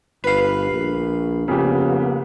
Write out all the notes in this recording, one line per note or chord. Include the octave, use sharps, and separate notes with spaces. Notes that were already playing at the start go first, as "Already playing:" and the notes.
G1 B4 F5
A#1
F2 C#3 A#3 B3 G4